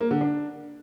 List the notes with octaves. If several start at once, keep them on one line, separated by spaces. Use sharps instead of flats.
A#3
D3
D4